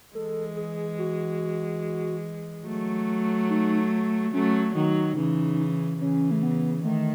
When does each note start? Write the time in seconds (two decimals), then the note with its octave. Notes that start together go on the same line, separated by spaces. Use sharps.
0.15 E3 G#3 A4
0.56 G#4
0.99 F#4
2.67 F#3 A3
3.50 D#4
4.33 F#3 A3 C#4
4.75 D#3 F#3 D#4
5.16 C#3 E3
6.00 C#3 E3 C#4
6.31 A3
6.43 B3
6.84 D#3 A3